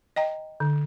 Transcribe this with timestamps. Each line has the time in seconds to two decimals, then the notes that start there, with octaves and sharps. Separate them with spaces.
0.16 D#5 G5 A#5
0.60 D3